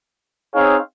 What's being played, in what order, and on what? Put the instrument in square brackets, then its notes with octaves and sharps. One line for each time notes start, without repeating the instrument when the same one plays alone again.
[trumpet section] C4 D#4 G#4 C#5 F5